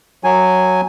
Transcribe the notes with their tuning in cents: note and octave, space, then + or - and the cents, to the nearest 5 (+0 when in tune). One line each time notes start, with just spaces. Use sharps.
F#3 +0 G#5 +0